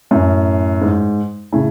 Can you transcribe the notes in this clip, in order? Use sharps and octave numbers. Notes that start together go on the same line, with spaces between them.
F#2 A2
G#2
A2 C#3